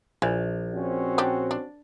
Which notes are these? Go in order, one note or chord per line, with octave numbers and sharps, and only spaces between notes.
A#1 E3
C4 C#4 F#4
D4 G4
D4